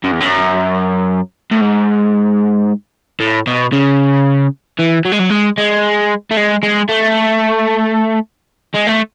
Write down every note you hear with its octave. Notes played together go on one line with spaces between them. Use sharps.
F#2
E2
F#2
A2
G#2
A2
B2
C#3
E3
F#3
G#3
F#3
G#3
G#3
A3
G#3
G#3
A3
G#3
A3